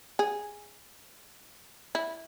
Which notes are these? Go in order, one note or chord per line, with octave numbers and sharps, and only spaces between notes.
G#4
E4